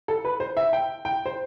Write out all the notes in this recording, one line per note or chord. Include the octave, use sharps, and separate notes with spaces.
A4
B4
C5
E5
G5
G5
C5